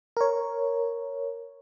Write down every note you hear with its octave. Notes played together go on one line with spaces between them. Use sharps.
A#4 C#5